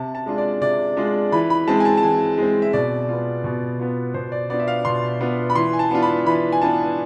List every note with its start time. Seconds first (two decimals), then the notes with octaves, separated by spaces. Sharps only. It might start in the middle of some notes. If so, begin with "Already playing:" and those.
Already playing: C3 A5
0.15 A5
0.26 G#3 D4 F4
0.38 D5
0.61 C3 D5
0.97 G#3 D4 F4
1.32 E3 B5
1.50 B5
1.68 G#3 C4 A5
1.80 G#5
1.85 A5
1.97 A5
2.03 E3 G#5
2.38 G#3 C4
2.62 E5
2.73 B2 D5
3.09 B3 F4
3.44 B2
3.79 B3 F4
4.14 B2 C5
4.32 D5
4.50 B3 D4 F4 D5
4.60 E5
4.68 F5
4.85 B2 C6
5.21 B3 D4 F4
5.50 B5
5.55 E3 C6
5.73 G#5
5.79 A5
5.91 B3 D4 F4
6.02 B5
6.26 E3 B5
6.52 G#5
6.62 B3 D4 F4 A5